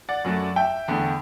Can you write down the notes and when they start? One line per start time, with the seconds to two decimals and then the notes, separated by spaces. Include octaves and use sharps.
0.09 D5 F#5
0.24 F#2 F#3 A3
0.56 E5 G5
0.88 E2 D3 A3